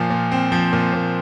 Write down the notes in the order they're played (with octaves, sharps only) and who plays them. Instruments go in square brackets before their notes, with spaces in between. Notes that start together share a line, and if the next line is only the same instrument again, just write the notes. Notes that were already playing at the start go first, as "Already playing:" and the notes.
Already playing: [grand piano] A#2 F3
A#2
C4
F3
A#2
A#2